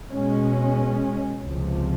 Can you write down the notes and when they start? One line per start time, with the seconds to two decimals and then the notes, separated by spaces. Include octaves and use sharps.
0.10 B2 G#3 C#4
1.44 C#2 C3 F3